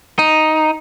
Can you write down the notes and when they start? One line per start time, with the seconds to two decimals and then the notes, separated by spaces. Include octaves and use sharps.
0.19 D#4